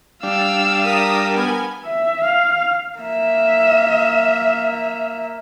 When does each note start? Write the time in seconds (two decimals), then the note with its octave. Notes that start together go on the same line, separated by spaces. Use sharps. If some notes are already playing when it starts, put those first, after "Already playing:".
0.23 G3 D4 F5 E6
0.84 A#4 A#5 D#6 B6
1.34 B3 G#5
1.85 E5
2.24 F5
2.98 A#3 E5